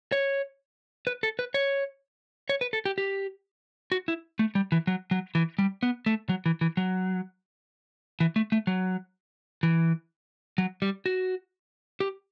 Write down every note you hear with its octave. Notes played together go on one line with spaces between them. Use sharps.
C#5
B4
A4
B4
C#5
C#5
B4
A4
G4
G4
F#4
E4
A3
G3
E3
F#3
F#3
E3
G3
B3
A3
F#3
E3
E3
F#3
E3
A3
A3
F#3
E3
F#3
G3
F#4
G4